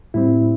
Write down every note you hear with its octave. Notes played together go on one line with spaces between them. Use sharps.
A2 G3 C4 E4